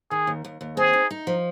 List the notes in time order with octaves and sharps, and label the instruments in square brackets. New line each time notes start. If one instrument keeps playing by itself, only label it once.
[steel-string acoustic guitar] D#3 [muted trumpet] G#4
[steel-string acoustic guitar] D#2
D#2
D#2
[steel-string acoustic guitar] C4 [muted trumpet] G#4
[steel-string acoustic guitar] D#4
D#4
F3